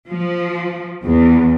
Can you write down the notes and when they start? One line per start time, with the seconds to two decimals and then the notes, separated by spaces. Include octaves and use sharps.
0.10 F3
1.04 E2